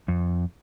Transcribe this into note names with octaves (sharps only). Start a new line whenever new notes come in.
F2